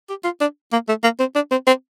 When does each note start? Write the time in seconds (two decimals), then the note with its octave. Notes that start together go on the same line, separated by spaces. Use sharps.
0.09 G4
0.24 F4
0.41 D4
0.73 A#3
0.88 A3
1.03 A#3
1.20 C4
1.35 D4
1.51 C4
1.67 C4